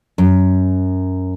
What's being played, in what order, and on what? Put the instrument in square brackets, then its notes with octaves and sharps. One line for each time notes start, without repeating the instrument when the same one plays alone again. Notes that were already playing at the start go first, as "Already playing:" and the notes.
[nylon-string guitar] F#2